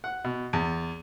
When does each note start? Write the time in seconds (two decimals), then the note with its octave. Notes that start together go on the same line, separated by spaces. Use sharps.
0.04 F#5
0.24 B2
0.53 E2